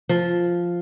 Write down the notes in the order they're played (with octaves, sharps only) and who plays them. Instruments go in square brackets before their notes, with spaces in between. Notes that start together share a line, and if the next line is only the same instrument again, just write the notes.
[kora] F3